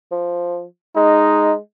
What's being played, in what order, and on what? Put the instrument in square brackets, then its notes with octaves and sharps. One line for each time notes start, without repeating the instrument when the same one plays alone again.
[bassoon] F3
[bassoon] G#3 [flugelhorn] D#4